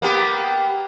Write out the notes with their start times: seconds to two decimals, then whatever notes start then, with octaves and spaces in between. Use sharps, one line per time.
0.02 A#3 B3 G4